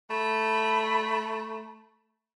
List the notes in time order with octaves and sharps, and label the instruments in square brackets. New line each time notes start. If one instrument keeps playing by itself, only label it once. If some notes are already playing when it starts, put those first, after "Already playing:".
[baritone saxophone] A3 [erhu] B5